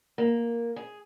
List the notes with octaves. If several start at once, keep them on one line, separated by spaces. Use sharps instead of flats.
A#3
G#4